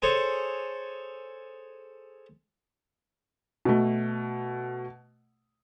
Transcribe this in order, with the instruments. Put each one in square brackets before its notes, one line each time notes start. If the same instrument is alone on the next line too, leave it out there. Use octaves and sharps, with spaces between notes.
[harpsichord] G#4 A4 C5 C#5
[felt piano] B2 A3